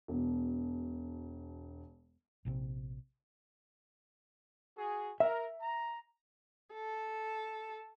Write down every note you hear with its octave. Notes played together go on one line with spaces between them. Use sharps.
E1 B2
A#1 C3 F3 C4
F#4 G#4
A#4 E5
A#5
A4